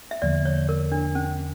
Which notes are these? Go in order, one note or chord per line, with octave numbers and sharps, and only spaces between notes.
E5
E2 D3 F3 A#3 D5
C#5
A#4
D4
C#4